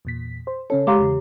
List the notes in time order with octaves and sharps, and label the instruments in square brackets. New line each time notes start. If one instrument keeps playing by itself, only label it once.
[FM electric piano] E2 A#2 B6
C5
[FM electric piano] C#3 C#4 A4 [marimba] C#5
[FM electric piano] G#3 F5 C6 [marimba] G4 A#5 D6
[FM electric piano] E2 C#3